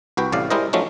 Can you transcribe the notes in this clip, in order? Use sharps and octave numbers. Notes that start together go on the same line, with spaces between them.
C2 F#4 B4 G5
A1 A2 C3 D5 F5
G3 G#3 E4 A#4 C5 D#5
F3 F#3 A3 C#4 D#4